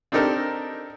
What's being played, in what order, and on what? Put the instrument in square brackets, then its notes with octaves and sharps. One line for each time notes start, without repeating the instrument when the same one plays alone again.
[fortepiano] C4 D4 D#4 G4 A4 A#4